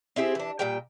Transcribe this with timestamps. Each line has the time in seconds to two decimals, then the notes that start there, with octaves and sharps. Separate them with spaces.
0.16 C4 E4 G4 G#4
0.35 E3 D4
0.59 A#2 G3 G5